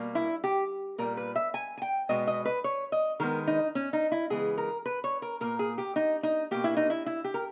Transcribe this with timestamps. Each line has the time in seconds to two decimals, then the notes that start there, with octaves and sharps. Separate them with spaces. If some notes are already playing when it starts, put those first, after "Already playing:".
Already playing: B2 G3 A#3
0.15 E4
0.44 G4
0.98 A#2 G3 A#3 A#4
1.17 B4
1.36 E5
1.54 G#5
1.78 G#5
1.82 G5
2.09 B2 G#3 B3 D#5
2.27 D#5
2.45 B4
2.64 C#5
2.92 D#5
3.20 D#3 G#3 B3 A#4
3.47 D#4
3.75 C#4
3.93 D#4
4.12 E4
4.30 C#3 E3 G#3 B3 G#4
4.58 A#4
4.86 B4
5.04 C#5
5.22 A#4
5.41 A#2 A#3 A#4
5.59 G#4
5.78 G4
5.96 D#4
6.23 D#4
6.51 B2 A#3 G4
6.64 E4
6.77 D#4
6.90 E4
7.06 E4
7.24 G4
7.34 A#4